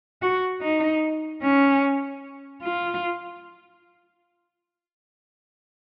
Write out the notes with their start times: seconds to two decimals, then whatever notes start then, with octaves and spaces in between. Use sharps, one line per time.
0.22 F#4
0.62 D#4
1.43 C#4
2.63 F4